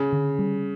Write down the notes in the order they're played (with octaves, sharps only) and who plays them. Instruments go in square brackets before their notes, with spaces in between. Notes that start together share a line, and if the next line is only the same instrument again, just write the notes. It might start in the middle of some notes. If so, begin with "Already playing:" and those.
Already playing: [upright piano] C#3 [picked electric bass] C#4
[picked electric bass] D3
G3